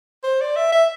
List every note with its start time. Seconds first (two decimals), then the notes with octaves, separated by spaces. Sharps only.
0.23 C5
0.41 D5
0.56 E5
0.72 E5